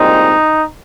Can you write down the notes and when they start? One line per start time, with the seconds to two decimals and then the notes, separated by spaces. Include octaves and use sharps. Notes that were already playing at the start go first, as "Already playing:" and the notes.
Already playing: C2 A#2 G#3 C4 D#4